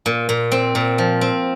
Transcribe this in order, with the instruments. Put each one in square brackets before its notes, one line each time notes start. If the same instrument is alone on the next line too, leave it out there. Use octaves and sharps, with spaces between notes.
[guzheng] A#2
A#2
C4
A#2
F3
C4